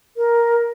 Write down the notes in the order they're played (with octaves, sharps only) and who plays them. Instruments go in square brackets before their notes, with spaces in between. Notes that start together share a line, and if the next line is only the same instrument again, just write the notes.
[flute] A#4